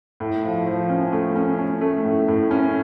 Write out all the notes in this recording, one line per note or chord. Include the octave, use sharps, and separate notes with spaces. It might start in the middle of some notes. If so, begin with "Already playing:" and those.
A2
F3
F3
C#4
A3
C#4
C#4
A3
A2
A2
C#4